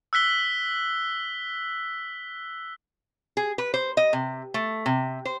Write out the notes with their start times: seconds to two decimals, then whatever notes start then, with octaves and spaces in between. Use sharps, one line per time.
0.13 E6 F#6 B6 G7
3.37 G#4
3.58 B4
3.74 C5
3.97 D#5
4.13 C3
4.54 A3
4.86 C3
5.25 C5